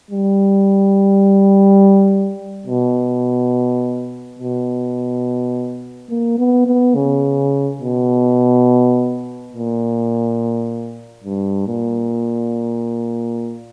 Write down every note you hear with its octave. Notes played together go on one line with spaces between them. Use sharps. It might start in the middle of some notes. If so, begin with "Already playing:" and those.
G3
B2
B2
A#3
B3
B3
C#3
B2
A#2
G2
A#2